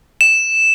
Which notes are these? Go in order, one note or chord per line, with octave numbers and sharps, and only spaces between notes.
E7